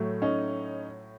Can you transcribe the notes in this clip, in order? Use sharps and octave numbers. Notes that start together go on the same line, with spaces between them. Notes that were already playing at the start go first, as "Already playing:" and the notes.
Already playing: A2 F#3 A3
C#4 D#4